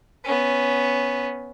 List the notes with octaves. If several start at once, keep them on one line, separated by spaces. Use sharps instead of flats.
B3 C#4